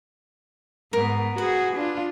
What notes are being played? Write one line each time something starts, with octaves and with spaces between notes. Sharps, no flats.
G#2 B3 A#4
F#4 G#4 B4
D4 F4